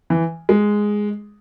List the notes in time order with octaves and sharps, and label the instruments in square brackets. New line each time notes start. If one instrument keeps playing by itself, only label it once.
[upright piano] E3
G#3